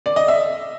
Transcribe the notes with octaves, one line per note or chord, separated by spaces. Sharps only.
D5
D#5
E5